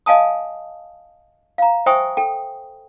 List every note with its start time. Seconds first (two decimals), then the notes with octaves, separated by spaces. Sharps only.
0.06 D#5 F5 G#5 A5 D#6
1.58 F5 A#5
1.86 C5 E5 G5 G#5 C#6 D#6
2.17 A4 G5